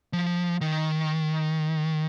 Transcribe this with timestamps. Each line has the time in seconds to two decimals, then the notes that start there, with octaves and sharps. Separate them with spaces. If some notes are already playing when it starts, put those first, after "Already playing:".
0.13 F3
0.61 D#3